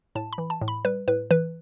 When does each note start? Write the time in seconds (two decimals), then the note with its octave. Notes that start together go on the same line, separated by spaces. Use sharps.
0.15 A2 A5
0.33 B5
0.38 E3
0.50 A5
0.61 A2
0.68 B5
0.85 G3 B4
1.08 A2 B4
1.31 E3 B4